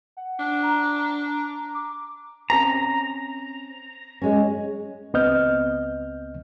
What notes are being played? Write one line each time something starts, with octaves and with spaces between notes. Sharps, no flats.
F#5
D4
A#5
D6
C4 C#4 A#5
G#3 C#4
C#2 B3 C4 D#5 F6 G6